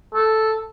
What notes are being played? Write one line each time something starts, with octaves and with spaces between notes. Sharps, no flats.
A4